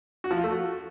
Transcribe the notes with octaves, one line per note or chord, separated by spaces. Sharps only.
F#4
F3
F4
A3
F#4